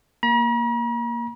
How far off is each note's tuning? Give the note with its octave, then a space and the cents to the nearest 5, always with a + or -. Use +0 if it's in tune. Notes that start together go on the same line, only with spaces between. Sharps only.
A#3 +0 A#5 +45